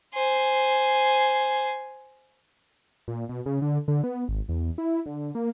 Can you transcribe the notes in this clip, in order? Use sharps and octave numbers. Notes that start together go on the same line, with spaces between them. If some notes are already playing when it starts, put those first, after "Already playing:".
C5 G#5
A#2
B2
C#3
D3
D3
B3
G#1
E2
E4
D3
A#3